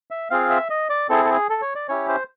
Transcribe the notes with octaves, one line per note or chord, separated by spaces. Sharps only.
E5
C4 F4 G#4 F5
E5
D#5
D5
C4 E4 G#4 A4
A4
G#4
A4
C#5
D5
C#4 E4 G4 C#5
C5